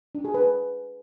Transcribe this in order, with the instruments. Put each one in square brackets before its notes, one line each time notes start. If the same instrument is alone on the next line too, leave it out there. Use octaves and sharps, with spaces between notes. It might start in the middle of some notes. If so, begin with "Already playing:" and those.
[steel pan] D4
G#4
B4